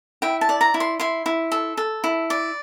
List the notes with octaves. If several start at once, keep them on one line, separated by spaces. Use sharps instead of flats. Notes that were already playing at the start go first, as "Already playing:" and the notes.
E4 G5
A5
D5
A#5
E4
C6
E4 C6
E4
A4
A4
E4
D5